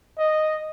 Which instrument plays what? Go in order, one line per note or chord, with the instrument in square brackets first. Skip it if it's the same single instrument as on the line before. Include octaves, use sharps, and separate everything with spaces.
[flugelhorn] D#5